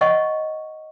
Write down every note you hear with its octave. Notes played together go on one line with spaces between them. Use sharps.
C#5 D#5 F#5 C#6